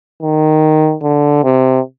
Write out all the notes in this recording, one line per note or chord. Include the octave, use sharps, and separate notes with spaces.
D#3
D3
C3